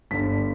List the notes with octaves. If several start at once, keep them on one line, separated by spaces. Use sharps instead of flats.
G1 G2 D3 G3 B6